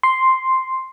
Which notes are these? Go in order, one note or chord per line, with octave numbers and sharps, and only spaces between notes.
C6